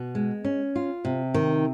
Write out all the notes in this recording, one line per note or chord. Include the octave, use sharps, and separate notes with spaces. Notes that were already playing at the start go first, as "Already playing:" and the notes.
Already playing: B2
G#3
C#4
F4
C3
D#3